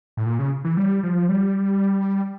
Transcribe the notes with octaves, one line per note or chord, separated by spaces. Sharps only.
A2
A#2
C#3
E3
G3
F3
G3